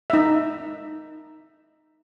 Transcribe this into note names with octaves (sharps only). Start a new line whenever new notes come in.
D#4 E5